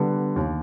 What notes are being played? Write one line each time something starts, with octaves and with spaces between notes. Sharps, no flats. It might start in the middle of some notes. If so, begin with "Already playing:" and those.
Already playing: D3 G3 B3
D#2